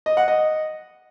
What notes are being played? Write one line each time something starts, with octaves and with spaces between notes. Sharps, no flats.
D#5
F#5
D#5